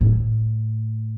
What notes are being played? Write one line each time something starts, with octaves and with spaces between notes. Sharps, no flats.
A2